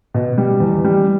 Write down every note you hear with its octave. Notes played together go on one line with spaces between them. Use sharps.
B2
G3
E2
G3